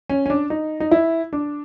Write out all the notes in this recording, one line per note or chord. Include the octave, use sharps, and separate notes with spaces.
C#4
C#4
D4
D#4
D#4
E4
D4